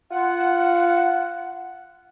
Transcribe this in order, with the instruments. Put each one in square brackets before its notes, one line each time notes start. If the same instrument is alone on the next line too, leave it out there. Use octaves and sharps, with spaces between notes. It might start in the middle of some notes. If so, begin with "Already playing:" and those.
[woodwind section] F4 F#5